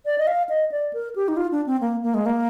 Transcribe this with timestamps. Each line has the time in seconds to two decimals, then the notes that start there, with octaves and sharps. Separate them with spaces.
0.05 D5
0.18 D#5
0.27 F5
0.49 D#5
0.71 D5
0.93 A#4
1.16 G4
1.28 D#4
1.37 F4
1.51 D4
1.66 C4
1.81 A#3
2.03 A#3
2.14 G#3
2.26 A#3